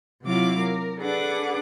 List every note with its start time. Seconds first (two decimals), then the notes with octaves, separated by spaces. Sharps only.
0.23 C3 F#3 E4 F4 F5 D6
0.60 A#4
0.99 D4 G#4 A4 B4 F#5 D6